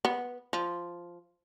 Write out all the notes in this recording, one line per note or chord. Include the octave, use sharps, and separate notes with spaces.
B3
F3